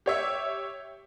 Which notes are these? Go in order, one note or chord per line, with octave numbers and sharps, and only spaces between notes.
G4 C#5 E5